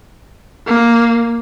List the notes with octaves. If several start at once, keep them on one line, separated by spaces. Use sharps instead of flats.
A#3